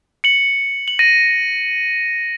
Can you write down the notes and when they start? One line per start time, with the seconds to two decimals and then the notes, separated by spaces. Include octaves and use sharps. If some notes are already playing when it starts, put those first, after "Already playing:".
0.24 C#7 F#7
0.88 F#7
0.99 A#6 D#7